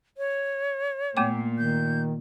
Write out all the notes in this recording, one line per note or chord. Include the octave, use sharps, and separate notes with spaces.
C#5
A#2 A3 B3 D6
D#3 G6